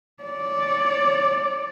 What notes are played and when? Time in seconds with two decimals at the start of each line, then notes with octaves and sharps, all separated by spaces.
0.23 C#5 D5